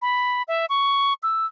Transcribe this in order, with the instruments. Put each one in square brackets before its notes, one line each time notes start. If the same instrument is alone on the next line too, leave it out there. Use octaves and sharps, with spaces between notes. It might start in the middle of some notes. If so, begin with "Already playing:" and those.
[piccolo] B5
E5
C#6
E6